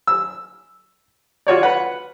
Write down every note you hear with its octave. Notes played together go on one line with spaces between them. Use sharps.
E6
F4 F#4 C#5 D5
B4 F#5